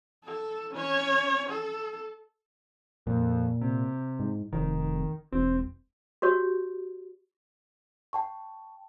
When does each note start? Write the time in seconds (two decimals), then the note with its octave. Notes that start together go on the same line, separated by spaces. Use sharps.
0.25 A4
0.73 C#4 C#5
1.49 A4
3.07 F2 A#2
3.61 C3
4.19 G#2
4.53 F1 D#3
5.32 E1 C4
6.22 F#4 G4 C#5
8.13 G5 A5 C#6